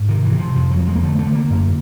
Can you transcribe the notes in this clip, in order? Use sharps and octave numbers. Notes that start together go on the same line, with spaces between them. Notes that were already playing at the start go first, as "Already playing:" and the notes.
Already playing: G#2
C3 D#3
E3
C3
F3
F2 F3
F#3
F2
G#3
A#3
D3 A3
A3
D3
A#3
F#2